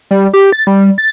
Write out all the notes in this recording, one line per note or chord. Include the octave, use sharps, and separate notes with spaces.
G3
G4
A6
G3
A6